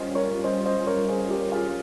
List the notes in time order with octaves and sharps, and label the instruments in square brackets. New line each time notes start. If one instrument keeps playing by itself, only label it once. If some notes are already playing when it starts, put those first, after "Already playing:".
Already playing: [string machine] G3 C#4 F4 [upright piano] C5 D#5
[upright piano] A#4 C#5
C5 D#5
C5 D#5
A#4 C#5
G#4 C5
G4 A#4
F4 G#4
G4